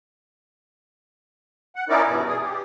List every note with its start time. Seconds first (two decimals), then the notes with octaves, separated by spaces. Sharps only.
1.76 F#5
1.89 C#4 D#4 E4 A#4 D5
2.07 E2 G2 B2
2.28 G#4
2.43 G4